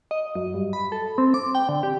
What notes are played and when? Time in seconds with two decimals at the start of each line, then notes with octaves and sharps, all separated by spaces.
0.11 D#5
0.35 F#2
0.54 G2
0.73 B5
0.92 A4
1.18 C4
1.34 D6
1.55 G5
1.69 D3
1.83 G4